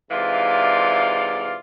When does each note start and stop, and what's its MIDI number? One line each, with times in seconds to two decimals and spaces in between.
0.11 1.56 44
0.11 1.56 48
0.11 1.56 52
0.11 1.56 65
0.11 1.56 74
0.11 1.56 77